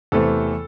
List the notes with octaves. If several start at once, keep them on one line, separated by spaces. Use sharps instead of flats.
E2 C3 E3 A3 C4 A4